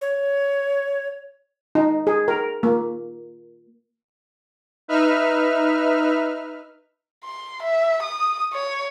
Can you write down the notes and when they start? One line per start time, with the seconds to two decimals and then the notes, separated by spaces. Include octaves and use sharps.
0.01 C#5
1.75 D#4
2.07 G#4
2.28 A#4
2.63 A#3
4.88 D#4 B4 E5 F6
7.25 C6
7.63 E5
8.03 D#6
8.53 C#5